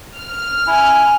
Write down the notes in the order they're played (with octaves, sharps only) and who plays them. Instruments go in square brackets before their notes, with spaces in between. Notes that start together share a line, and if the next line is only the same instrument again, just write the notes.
[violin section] F6
[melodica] E4 [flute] G#5